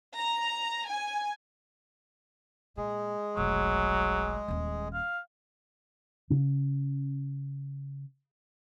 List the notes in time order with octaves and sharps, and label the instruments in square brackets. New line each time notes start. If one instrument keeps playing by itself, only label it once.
[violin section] A#5
G#5
[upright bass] A#2 [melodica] G#3 G#4
[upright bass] F1 B1 [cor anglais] F#3
[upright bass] D#1 D#2
[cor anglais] F5
[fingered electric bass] C#3 C#4